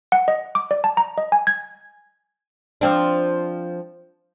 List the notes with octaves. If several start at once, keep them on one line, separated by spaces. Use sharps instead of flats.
F#5
D#5
D6
D5
A5
A#5
D#5
G#5
G#6
F3 C4 D4